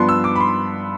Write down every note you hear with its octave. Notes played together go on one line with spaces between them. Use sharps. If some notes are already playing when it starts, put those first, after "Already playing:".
Already playing: G2 F3 B3 D4 C6
E6
D6
B5
C6